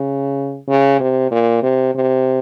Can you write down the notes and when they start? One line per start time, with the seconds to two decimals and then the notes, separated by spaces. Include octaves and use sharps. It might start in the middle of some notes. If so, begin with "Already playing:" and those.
Already playing: C#3
0.68 C#3
1.00 C3
1.31 A#2
1.62 C3
1.95 C3